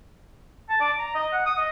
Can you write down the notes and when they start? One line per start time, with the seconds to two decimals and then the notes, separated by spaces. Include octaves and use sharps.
0.69 A5
0.81 D5
0.99 A#5
1.15 D#5
1.33 F#5
1.46 D#6
1.58 D#5